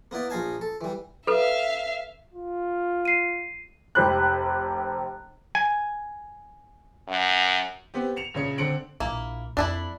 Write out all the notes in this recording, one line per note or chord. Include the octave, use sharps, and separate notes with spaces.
A#3 B3 E4 D5
A#1 D#4 D#5 F5 G#5 A5
A4
E3 G3
A4 B4 E5 F5
F4
C7 D#7
F1 G4 C5 B5 F#6
G#5
F#2
B3 C4 G4
C#7 E7 F7
A#1 C#3 C#5 C#7
D3 C4 C#7 D7 F#7
A#1 A#3 E4
F2 D4 E4 B5